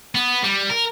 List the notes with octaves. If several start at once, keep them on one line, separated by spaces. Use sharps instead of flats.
B3
G3
A#4